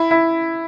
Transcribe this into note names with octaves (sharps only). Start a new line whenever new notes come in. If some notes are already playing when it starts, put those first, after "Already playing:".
Already playing: E4
E4